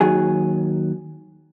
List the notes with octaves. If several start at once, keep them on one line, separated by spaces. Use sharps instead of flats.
D#2 D#3 F#3 G#4